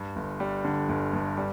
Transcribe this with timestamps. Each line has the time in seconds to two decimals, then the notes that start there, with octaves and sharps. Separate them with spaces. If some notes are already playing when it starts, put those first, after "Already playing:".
Already playing: G2
0.16 G1
0.40 G3
0.65 D3
0.89 G1
1.13 G2
1.37 G3